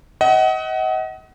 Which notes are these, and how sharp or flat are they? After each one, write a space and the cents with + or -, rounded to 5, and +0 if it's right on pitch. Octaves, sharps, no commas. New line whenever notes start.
D#5 +35 F#5 +25